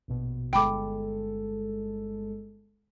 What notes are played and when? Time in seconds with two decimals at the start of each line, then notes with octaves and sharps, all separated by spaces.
0.08 A#1 B2
0.53 G1 G#3 A4 G5 B5 D6